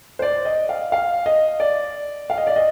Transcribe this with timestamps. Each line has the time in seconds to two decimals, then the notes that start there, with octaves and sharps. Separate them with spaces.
0.19 C5
0.22 D5
0.45 D#5
0.69 F5
0.92 F5
1.26 D#5
1.60 D5
2.30 F5
2.38 D#5
2.47 D5
2.56 D#5